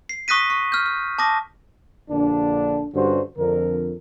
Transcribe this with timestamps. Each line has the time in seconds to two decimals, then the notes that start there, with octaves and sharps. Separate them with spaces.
0.09 C7
0.28 C#6 D#6 F#6 A#6 B6 D#7
0.50 C#6
0.72 F6 G6
0.86 F6
1.19 A5 D6 D#6 A#6
2.10 A#1 D3 A#3 D4
2.94 G2 D3 G3 C#4 F#4 C5
3.37 F2 D3 A#4